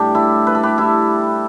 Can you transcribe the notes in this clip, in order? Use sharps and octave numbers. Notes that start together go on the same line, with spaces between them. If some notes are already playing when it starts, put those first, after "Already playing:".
Already playing: A2 G3 D4 G4
E4 A4
B4
A4
G4 B4
E4 A4